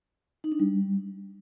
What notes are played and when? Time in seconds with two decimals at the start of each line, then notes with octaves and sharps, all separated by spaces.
0.44 D#4
0.52 D4
0.59 G3